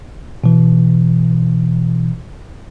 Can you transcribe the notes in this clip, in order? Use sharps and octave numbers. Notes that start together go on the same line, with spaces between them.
B2 E3